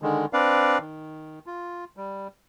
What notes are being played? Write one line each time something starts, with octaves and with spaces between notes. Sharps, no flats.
D3 D#3 G#3
C4 D4 B4 D5 F5
D#3
F4
G3